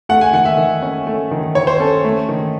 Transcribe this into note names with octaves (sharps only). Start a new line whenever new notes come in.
A3 F#5
G#5
D#3 F#5
E5
D#3
C#4
A3
D#3
D#3 C#5
C5
C#4 A4
A3
D#3